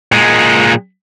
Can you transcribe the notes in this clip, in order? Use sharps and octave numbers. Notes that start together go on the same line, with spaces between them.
A#2 G#3